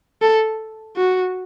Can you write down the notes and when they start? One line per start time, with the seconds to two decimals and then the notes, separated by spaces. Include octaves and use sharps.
0.22 A4
0.96 F#4